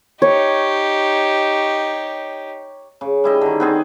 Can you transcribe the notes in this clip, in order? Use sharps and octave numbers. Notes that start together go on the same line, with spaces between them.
D#4 G4 C#5
C#3
G3 E4 D#5
D3 D#3
B3 C4 G#4